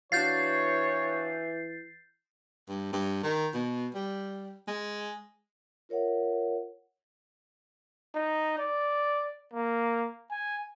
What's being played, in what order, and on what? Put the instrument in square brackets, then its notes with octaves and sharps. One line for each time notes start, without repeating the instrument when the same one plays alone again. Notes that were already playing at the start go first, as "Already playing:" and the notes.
[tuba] E3 [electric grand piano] D4 F#4 F5 [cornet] C#5 [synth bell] G6 A6 C7
[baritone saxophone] G2
G2
D#3
B2
G3
G#3
[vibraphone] F4 A#4 C#5 E5 F#5
[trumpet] D#4
D5
A#3
G#5